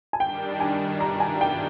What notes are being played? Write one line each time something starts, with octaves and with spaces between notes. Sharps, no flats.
G#5
D#3 G3 D4 G5
G#5
A#5
G#5
G5